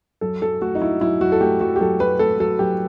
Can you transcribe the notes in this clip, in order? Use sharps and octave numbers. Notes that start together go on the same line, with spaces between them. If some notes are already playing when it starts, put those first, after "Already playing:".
F#2 A4
F#2 A4
A3 F#4
D#4
F#3 E4
F#2 E4
F#2 F#4
A4
A3 G4
F#3 F#4
G4
F#2 A4
F#2 B4
A3 A4
F#3 A4
F#2 G4